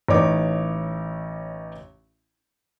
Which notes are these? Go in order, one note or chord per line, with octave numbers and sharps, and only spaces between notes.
A1 D#4 C#5 D6